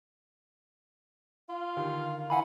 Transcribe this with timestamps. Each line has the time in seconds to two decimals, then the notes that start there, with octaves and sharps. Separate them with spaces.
1.49 F4 F5
1.77 D3 D#3 G4
2.30 E3 F#5 G#5 B5